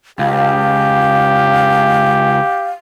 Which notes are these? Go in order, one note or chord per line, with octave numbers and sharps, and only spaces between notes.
C#2 G4 F5